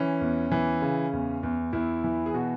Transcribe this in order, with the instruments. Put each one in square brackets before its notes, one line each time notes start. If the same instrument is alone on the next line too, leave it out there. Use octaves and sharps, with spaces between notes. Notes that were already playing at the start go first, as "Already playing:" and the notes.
Already playing: [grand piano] E3 C#4
E2
E3
C#3
E2
E2
E2 E4
E3
G#4
B2 F#4